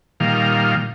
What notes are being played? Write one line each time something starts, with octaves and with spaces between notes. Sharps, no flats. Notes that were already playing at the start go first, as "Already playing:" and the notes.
A#2 D#3 G3 F5